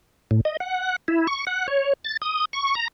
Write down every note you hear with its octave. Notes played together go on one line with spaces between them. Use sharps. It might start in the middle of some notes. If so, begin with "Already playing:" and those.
A2
D#5
F#5
E4
C#6
F#5
C#5
A6
D#6
C#6
A#5